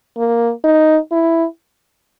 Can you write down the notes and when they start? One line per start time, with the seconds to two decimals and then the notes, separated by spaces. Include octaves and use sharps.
0.17 A#3
0.64 D#4
1.12 E4